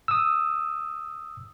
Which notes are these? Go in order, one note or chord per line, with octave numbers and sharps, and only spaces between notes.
D#6 E6